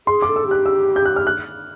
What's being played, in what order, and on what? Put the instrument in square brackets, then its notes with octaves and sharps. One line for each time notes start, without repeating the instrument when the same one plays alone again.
[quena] G#4 [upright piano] C6
[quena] A4 [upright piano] D6
[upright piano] E6
[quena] G4 [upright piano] F#6
[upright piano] E6
G6
F#6
F6
F#6